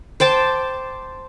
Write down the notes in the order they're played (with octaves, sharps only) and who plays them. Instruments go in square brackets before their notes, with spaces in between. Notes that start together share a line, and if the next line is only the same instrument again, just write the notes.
[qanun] C5 G5 A5 D6